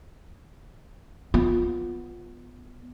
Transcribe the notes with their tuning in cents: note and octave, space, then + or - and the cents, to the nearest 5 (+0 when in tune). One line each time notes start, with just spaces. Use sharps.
B3 +0 F4 +10